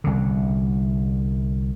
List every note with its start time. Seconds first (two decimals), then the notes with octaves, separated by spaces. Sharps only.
0.04 C2 D3